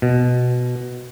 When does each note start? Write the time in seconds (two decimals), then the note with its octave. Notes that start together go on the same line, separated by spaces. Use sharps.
0.02 B2